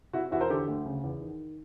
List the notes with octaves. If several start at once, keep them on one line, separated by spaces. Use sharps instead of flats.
C3 E4 F#4
E2 E4 F#4
A#4 C5
D3 G4 A4
D2
C#3
E2
D#3